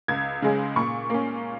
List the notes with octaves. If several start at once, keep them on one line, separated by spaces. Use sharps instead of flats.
C#2 G#6
C#3 G#3 C#4
A#2 C#6
A#3 C#4